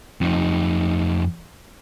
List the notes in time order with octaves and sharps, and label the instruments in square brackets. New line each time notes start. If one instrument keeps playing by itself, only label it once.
[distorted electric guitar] F2 D#4